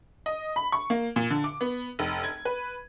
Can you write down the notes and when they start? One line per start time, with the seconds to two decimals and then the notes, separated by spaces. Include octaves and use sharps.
0.26 D#5
0.56 B5
0.72 C#6
0.90 A#3
1.16 A#2
1.30 D3
1.44 D6
1.61 B3
1.99 F1
2.24 G#6
2.45 B4